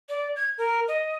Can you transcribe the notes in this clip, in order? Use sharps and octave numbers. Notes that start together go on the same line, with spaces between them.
D5
G#6
A#4
D#5